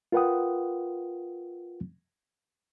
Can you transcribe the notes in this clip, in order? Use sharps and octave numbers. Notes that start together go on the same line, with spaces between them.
F4 A#4 B4 F#5 G5 D#6